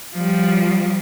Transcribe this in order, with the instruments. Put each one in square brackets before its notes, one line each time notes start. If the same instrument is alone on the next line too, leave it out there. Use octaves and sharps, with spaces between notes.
[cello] F3 G3